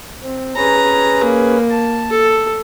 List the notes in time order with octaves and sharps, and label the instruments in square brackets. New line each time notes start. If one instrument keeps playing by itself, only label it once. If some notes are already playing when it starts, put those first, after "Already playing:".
[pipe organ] C4
[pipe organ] C#4 G#4 B4 [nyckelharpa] A#5
[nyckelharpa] A#3
[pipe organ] A5
[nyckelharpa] A4